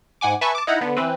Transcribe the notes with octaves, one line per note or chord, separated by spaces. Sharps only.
G#2 F#5 G#5 D6
B4 E5 G#5 A5 C#6
A5 D6
D#4 E4 F#5 A#5 B5
D3 B3
E3 C4 B4